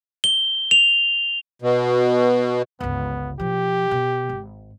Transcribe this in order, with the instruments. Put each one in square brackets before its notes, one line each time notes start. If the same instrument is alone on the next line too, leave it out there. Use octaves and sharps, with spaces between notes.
[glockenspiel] G7
F7
[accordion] B2
[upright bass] G1 C#2 [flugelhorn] B3
[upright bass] B2 F3 [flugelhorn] G4
[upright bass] B2
G#1